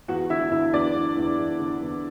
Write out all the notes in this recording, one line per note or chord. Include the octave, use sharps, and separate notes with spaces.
E2 F#4 F#5
D3 E4 E5
D3 E4 E5
E2 D4 D5
E2
E2
E2
D3
E2